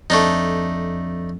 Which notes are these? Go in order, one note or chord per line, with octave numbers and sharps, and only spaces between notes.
F2 A3 D4 D#4